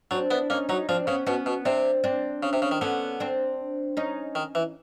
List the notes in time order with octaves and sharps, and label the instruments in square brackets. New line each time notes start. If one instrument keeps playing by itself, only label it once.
[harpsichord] F#3 [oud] C4 D4
[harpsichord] B3 [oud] D4 E4
[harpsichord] A#3 [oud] C#4 D#4
[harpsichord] F#3 [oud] C#4 D#4
[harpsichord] F3 [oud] C4 D4
[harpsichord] C#3 [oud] B3 C#4
[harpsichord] B2 [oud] B3 C#4
[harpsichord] B2
[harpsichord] C3 [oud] C4 D4
[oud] C4 D4
[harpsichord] C#3
C3
C#3
D#3
[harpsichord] D3 [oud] B3 C#4
[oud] C4 D4
C#4 D#4
[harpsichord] D#3
E3